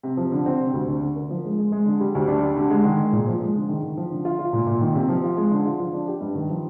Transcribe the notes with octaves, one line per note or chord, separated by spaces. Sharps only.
C3
F3
D3
C4
C3
D2
D3
D3
A#4
F3
G#3
G#3
G#3
D3
G3
D2
D4
G3
D3
G#3
D#3
G#3
A#2
F3
G#3
D3
D#3
D#3
F3
D3
F4
F4
A#2
A#2
D#3
C3
F3
F4
G#3
D3
F4
F3
D4
G4
G2
D#3
F3